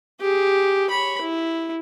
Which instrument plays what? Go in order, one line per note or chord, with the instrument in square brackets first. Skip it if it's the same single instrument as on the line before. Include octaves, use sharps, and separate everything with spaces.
[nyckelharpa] G4 G#4
C#5 B5
E4